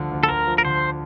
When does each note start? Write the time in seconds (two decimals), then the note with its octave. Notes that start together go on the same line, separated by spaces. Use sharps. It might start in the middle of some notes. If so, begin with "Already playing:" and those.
Already playing: D2 D3 F3
0.12 D2
0.23 A4
0.29 D2 A#4
0.47 F3
0.58 A#4
0.65 D3 C5